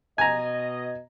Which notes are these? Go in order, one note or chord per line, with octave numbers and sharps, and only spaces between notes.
B2 D#5 G#5 A#5